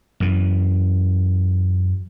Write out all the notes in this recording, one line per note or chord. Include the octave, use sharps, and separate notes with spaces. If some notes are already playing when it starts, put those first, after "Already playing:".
F#2 E3